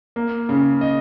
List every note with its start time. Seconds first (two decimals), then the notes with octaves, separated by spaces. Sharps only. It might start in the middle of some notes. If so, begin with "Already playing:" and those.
0.16 A#3
0.49 C#3
0.81 D#5